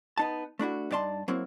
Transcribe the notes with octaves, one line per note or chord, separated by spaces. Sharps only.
B3 D#4 A5
A3 D4 E4 F#4
G2 D#4 D5 A5 C6
F#3 A#3 C4 E4